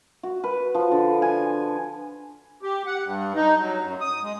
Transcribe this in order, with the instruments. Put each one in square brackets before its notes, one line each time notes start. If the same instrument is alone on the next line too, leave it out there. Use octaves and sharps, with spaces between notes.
[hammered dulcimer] F#4
B4
F3
D3
G#5
[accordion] G4
F#5
G2
D#4
F#3
F#2
D#6
G#3